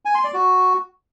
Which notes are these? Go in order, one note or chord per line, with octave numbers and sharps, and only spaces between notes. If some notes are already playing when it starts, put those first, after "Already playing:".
G#5
C6
D5
F#4